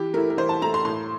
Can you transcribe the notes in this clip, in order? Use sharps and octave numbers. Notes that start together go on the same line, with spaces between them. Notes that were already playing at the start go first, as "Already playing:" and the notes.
Already playing: E3 G4
A3 E4 A#4
A#4
E3 C5
A5
A3 E4 A#5
C6
A2 C6